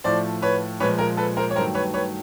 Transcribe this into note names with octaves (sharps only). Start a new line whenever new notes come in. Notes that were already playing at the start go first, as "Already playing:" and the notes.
A2 F3 A3 C5 D5
B4 C#5
A#2 F3 G#3 B4 C#5
A#4
A4 B4
A#4 C5
C#5
G2 D#3 F#3 A3 A#4 C5
B4 C#5
B4 C#5